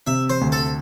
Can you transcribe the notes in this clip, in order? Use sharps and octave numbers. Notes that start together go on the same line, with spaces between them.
C3 E5
C5
D2
A4